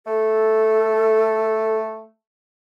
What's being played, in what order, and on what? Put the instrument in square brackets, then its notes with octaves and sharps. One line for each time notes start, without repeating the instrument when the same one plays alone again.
[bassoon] A3 [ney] A4